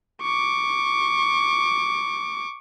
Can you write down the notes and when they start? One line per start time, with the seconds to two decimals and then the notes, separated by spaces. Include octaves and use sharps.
0.22 C#6 D6